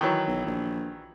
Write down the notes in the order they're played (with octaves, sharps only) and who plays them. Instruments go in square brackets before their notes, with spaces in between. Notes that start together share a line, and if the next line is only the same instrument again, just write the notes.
[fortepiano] D#3 E3 F#3
[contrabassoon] B1
A#1